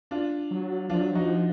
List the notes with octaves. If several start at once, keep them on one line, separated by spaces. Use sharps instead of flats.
D4 F4
F#3
F3 D4 F4
F#3
F3 D#4 F#4